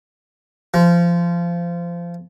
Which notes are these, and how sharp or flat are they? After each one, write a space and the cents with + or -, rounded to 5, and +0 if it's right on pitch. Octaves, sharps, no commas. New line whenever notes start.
F3 -20